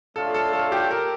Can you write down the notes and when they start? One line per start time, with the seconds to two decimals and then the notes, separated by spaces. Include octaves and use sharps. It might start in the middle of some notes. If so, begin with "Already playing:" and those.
0.16 A3 D4 F4 A4 C#5 F5
0.34 A4
0.53 A4
0.72 G4
0.91 A#4